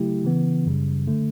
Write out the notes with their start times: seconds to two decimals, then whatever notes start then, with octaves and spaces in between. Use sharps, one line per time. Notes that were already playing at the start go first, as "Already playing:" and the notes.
Already playing: C#3 F#3 A3 E4 G4
0.25 C#3 E3 B3
0.66 F#2 C#3 G3
1.07 D3 A3